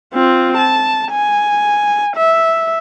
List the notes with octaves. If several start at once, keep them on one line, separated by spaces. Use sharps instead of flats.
C4 F4
A5
G#5
E5